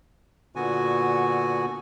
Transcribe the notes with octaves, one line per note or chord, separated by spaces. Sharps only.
A#2 D3 B3 F#4 G#5